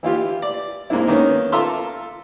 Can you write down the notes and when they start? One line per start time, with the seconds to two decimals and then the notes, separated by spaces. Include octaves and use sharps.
0.03 E3 E4 F4 G4
0.42 D5
0.90 G#3 A#3 C4 D4 E4
1.08 D#3 A#3 B3 C#4
1.52 F4 A4 E5 A#5 C6 D6